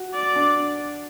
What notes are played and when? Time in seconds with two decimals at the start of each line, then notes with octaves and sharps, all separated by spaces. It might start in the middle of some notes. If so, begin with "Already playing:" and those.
Already playing: F#4
0.15 D5
0.36 D4